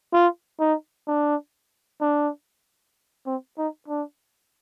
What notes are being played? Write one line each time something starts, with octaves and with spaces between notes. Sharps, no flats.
F4
D#4
D4
D4
C4
D#4
D4